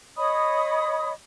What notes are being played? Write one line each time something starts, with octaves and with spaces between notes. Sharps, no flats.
C#5 D#5 B5 D#6